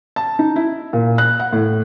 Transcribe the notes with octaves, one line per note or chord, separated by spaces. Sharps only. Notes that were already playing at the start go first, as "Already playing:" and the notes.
A5
D#4
E4
A#2
F#6
F#5
A2